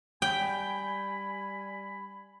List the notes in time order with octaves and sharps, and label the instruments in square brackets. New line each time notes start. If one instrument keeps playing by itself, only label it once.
[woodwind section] G3 G#5 B5 [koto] G5